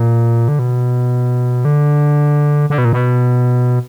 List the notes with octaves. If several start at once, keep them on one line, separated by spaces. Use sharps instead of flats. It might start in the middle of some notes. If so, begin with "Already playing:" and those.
Already playing: A#2
D3
B2
D3
D3
B2
A#2
B2